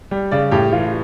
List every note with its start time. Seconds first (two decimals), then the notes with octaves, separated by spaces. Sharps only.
0.11 G3
0.31 C#3 D5
0.51 A2 G4
0.72 E3 F4